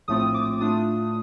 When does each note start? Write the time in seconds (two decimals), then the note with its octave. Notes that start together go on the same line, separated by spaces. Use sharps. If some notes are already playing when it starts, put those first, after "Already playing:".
0.08 A#1 A2 A3 C4 F4 D#6
0.34 D6
0.60 A2 A3 D4 F4 D#6